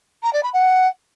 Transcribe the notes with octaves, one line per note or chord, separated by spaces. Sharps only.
A#5
D5
B5
F#5